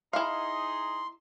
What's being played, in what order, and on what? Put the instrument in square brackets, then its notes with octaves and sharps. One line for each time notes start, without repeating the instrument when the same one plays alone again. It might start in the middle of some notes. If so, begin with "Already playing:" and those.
[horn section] D#4 G#4 [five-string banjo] E4 F5 [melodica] C6